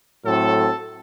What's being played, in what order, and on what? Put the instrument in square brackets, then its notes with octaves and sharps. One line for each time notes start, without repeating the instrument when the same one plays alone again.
[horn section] A2 F#3 C4 A4